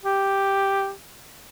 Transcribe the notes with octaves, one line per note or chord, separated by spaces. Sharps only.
G4